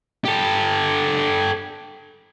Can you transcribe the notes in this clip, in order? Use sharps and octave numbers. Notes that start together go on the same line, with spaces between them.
G4 A4